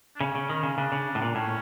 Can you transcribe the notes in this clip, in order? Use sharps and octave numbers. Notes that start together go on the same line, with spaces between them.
D4
C#3 C#4
C#3
D#3
C#3
C#3 D4
C#3
A2
A#2
A2 C#4